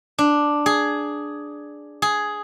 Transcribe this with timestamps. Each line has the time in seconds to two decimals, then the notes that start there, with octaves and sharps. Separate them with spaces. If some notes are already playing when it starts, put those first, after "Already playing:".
0.18 D4
0.66 G#4
2.02 G#4